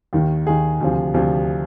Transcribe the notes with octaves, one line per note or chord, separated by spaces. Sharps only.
D#2 D#3
D#2 D#3 G#4
D2 C3 F3
D2 C3 F3